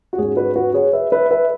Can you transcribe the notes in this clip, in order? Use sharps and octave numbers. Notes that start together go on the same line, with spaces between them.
F#4
G#2 G#3 C#4 G#4
F#4 B4
F#4 B4
G#4 C#5
B4 E5
B4 E5
B4 E5